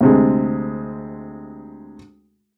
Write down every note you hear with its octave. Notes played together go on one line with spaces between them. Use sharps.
D2 C3 G#3